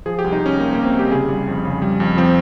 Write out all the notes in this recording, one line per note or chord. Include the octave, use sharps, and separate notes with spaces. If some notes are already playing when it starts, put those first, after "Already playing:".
F3 G#4
G4
C2
D#4
C2 C#4
C2 A#3
C3 A#3
C4
C2
G4
C#3 G#4
G3
F2
C#3
G3
F2
F3 C4